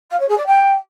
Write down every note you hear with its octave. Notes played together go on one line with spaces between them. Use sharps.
F5
C#5
G#4
D5
G5